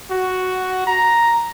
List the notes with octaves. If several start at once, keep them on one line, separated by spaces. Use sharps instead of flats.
F#4
A#5